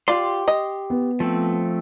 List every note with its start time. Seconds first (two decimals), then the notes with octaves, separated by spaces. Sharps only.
0.08 F4 G4 D5 C6
0.48 D#5
0.90 B3
1.20 F3 A3 C4